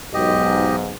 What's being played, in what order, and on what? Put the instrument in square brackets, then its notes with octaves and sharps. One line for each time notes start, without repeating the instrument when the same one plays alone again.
[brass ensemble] B1 G#2 [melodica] G4 D#5